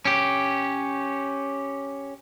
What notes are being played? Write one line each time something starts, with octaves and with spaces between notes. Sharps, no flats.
C#4 G4